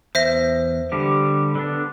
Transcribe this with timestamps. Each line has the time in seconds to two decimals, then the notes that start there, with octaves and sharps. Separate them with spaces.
0.15 E2 C5 E5 A#6
0.92 D3 G3 G4
1.55 D3 B3 D4